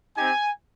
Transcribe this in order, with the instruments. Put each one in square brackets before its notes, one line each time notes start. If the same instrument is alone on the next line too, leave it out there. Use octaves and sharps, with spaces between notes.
[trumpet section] C4 D#4 G4 G#5